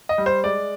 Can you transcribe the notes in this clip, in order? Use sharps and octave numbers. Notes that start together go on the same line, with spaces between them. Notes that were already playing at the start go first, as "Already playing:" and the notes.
D#5
G3
C5
G#3 D5